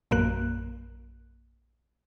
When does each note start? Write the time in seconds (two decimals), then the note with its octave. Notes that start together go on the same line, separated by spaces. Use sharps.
0.11 A#1 F#2 A#3 F#6